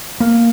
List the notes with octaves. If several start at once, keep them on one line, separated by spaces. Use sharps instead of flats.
A#3